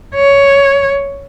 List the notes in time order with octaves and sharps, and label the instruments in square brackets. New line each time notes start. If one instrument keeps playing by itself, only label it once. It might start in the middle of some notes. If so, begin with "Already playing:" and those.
[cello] C#5